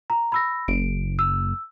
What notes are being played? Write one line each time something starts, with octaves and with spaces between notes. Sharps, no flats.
A#5
B5 E6 A#6
F#1 D7
E6